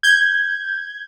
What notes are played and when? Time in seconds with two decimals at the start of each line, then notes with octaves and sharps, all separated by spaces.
0.03 G6 G#6